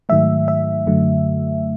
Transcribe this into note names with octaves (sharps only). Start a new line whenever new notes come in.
G#2 D#3 F#3 A3 E5
E5
F#2 D3 F#3 A3